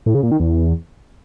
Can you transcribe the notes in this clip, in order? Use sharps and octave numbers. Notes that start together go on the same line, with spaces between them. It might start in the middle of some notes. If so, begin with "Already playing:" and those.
A2
C#3
A#2
D#3
E2